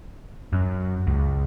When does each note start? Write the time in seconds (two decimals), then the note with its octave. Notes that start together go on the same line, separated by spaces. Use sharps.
0.53 F#2
1.07 C#2